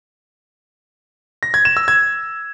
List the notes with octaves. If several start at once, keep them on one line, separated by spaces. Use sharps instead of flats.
A#6
G#6
E7
E6
G#6